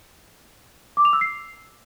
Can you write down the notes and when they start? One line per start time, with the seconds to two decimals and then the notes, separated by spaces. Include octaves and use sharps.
0.97 D6
1.05 F7
1.13 E6
1.21 C7